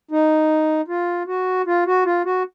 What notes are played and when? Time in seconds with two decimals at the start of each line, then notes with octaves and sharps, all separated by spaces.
0.11 D#4
0.88 F4
1.27 F#4
1.66 F4
1.86 F#4
2.05 F4
2.25 F#4